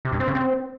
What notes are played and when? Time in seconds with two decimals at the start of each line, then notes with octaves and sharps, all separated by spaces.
0.05 C3
0.12 G2
0.20 C4
0.27 C#3
0.35 C4